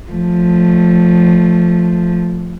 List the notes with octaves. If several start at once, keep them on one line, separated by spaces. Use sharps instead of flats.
F3 A3